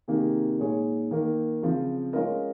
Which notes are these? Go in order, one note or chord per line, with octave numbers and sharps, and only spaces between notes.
C3 D#3 A#3 D#4 G#4
A#2 G#3 D#4 G#4 C#5
D#3 A#3 D#4 A#4
C#3 F3 C4 F4
G#3 C#4 F4 A#4 D#5